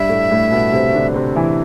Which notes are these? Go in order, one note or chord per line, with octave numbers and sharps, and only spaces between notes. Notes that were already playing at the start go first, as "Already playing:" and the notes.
Already playing: G2 G3 E5
A2 A3
A2 A3
B2 B3
C3 C4
D3 D4
C3 C4
E3 E4